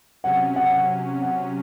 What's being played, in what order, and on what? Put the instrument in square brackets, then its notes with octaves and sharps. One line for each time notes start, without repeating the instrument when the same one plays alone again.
[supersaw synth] C3 F#3 C#4 [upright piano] F#5
[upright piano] F#5
F#5
F#5